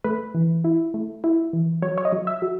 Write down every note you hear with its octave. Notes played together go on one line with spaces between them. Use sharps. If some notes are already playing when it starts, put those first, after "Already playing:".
A3 B4
E3
E4
A3
E4
E3
F#3 C#5
C#5
D#5
F#3
E5
F#3